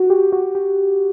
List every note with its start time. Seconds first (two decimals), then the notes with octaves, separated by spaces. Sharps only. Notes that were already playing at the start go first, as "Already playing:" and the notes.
Already playing: F#4
0.10 G4
0.32 F#4
0.55 G4